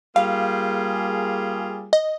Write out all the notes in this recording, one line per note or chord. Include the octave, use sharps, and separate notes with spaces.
G3 A#3 F4 G#4 F5
D#5